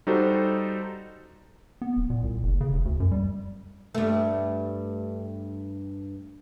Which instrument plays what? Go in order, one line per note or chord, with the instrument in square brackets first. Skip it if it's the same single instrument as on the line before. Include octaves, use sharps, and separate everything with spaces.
[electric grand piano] G3 D#4 F#4 A4 C5
[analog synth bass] B3
D1
A#2
C2
F#1
C#3
F1
D2
F#2
G3
[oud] G2 A3